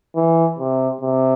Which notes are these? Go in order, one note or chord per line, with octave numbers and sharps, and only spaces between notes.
E3
C3
C3